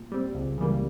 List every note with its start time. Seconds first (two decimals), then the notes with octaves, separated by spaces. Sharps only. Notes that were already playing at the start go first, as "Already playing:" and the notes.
Already playing: A#2
0.12 G3 C4
0.35 C#2
0.58 C#3 E3 G3 A#3